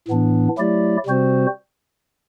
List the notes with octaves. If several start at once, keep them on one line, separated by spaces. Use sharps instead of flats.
A2 E3 B3 D4
F#3 A3 E4 G4 D5
C3 G3 C4 F#4 C5